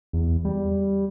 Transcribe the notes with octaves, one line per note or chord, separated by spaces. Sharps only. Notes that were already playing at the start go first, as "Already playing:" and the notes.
E2
G3